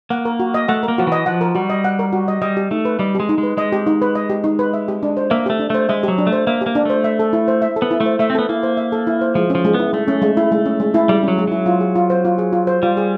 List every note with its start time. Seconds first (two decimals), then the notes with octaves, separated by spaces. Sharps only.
0.10 A#3 F#5
0.25 A#4
0.40 F#4
0.54 D#5
0.68 A3 F#5
0.83 A#4
0.88 A#3
0.98 F3 F#4
1.07 E3 D#5
1.26 F3 F#5
1.41 A#4
1.55 G3 F#4
1.70 D#5
1.84 F#5
1.99 A#4
2.13 F#4
2.28 D#5
2.42 G3 D#5
2.57 G4
2.71 A3 D#4
2.85 B4
2.99 G3 D#5
3.15 G4
3.20 G#3
3.29 D#4
3.38 G#3
3.43 B4
3.57 G#3 D#5
3.73 G4
3.87 D#4
4.02 B4
4.15 D#5
4.30 G4
4.44 D#4
4.59 B4
4.74 E5
4.88 G4
5.03 D4
5.17 C5
5.31 A#3 E5
5.46 A3 G4
5.59 D4
5.70 A3 C5
5.89 G#3 E5
6.03 F#3 G4
6.18 D4
6.27 A3
6.32 C5
6.47 A#3 E5
6.61 A#3 G4
6.75 D4
6.85 A3 C5
7.04 E5
7.19 A4
7.33 E4
7.48 C5
7.62 E5
7.76 A4
7.82 B3
7.91 E4
8.00 A3
8.06 C5
8.19 A3 E5
8.30 C4
8.35 B3 A4
8.49 A#3 E4
8.63 C5
8.77 E5
8.92 A4
9.07 E4
9.21 C5
9.35 F3 G#3
9.50 F3 C#4
9.65 G#3
9.74 B3
9.79 E4
9.93 G#3 A3
10.08 C#4
10.22 G#3
10.37 E4
10.52 G#3
10.66 C#4
10.80 G#3
10.94 E4
11.08 G3 G#3
11.23 F#3 C#4
11.38 G#3
11.48 F#3 E4
11.66 F4
11.81 G#4
11.96 F4
12.10 C5
12.25 F4
12.38 G#4
12.53 F4
12.67 C5
12.83 G3 F4
12.97 G#4